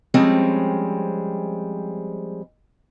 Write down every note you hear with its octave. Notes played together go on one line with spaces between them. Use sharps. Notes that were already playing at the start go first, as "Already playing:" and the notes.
F3 G3 G#3 C4 C#4